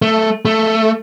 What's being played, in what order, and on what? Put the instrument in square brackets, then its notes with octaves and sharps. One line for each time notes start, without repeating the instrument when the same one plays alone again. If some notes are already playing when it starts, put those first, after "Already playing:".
[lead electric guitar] A3
A3